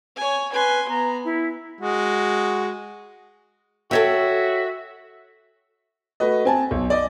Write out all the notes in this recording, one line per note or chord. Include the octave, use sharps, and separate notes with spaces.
C#5 G#5
B4 G#5 C6
B3 A#5
E4
G#3 F#4
F#4 A4 C#5 E5 G5
A3 F#4 B4 D#5
C4 G#5 A5
B1
D5 D#5